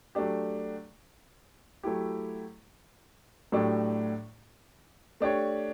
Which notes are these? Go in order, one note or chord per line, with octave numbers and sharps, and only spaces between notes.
F#3 A3 D4 G4
F#3 A3 E4 G4
A2 F#3 A3 D4 G4
A3 D4 G4 C#5